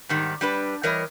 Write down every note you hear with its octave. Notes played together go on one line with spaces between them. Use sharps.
G#2 D#3 G3
G3 D4 B4
E3 G3 A#4 C#5 D#5